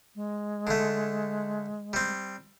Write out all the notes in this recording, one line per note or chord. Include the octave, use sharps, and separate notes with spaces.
G#3
D3 A3
G3 C4